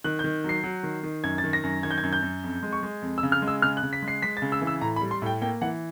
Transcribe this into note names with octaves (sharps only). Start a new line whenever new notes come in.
D#3 F#6
G6
D#3
F#3 C7
F#3
D#3
D#3
F#2 G#6
A6
D#3
A#6
F#2
D#3 G#6
G6
G#6
F#2
G6
F#2
F2
G#3
C#6
G#3
F2
E6
C#3
F6
G#3
E6
C#3 F6
F#6
C#3
B6
G#3
C7
G#3 B6
A6
C#3
E6
E3
E6
A2 A#5
B5
G3
C6
A2 G5
A#3 G5
E3 F#5